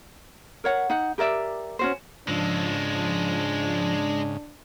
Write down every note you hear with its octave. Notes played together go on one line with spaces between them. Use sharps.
A#4 C#5 F#5
D#4 F#5
G4 A#4 D5 E5
C#4 F#4 C5
G#2 C#3 F3 G#3 D4 A4